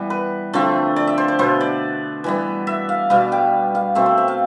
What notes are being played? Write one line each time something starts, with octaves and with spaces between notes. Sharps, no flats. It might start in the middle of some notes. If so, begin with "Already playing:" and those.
Already playing: E3 G3 B3
B4
D3 F3 A3 C4
D5
E5
C5
C5
B2 B3 C5
D5
E3 G3 B3
E5
F5
B2 G3 B3 F5
G5
F5
B2 A3 C4 E5
C5
E5
F5